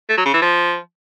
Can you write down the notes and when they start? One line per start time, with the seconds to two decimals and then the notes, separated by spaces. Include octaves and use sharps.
0.09 A3
0.17 F#3
0.25 C#3
0.34 E3
0.42 F3